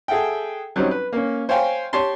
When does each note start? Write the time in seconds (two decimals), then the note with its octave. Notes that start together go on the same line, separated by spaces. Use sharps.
0.08 G#4 A4 E5 F#5 G5
0.76 F#3 G3 C4 C#4 D#4
0.91 B4
1.13 A#3 C#4
1.49 C5 C#5 F5 G5 G#5 C6
1.93 G4 C#5 A5 C6